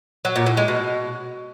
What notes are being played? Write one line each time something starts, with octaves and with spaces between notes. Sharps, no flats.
F#3
A#2
A2
G#3
B2